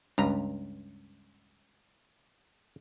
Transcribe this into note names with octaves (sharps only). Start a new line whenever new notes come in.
C#2 G2 A#5